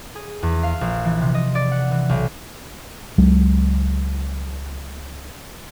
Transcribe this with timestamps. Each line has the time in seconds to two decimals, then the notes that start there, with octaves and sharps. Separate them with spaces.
0.15 G#4
0.43 E2
0.63 F5
0.81 A#1
1.05 E3
1.21 C3
1.34 D#5
1.55 D5
1.71 F#5
1.91 E3
2.09 B1
3.18 C#2 F#3 G#3